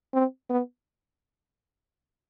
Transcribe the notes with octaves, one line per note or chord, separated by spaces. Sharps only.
C4
B3